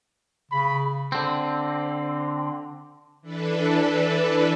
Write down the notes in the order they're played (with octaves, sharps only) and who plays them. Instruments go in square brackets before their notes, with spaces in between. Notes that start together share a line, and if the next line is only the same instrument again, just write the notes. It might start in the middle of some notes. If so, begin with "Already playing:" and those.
[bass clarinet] C#3 [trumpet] B5
[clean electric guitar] D3 C4
[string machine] E3 D4 A4 B4